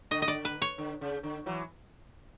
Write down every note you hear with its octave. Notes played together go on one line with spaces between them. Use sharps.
D3 D#5
D#5
D5
B4
C#5
D3
C#3
D3
E3 F#3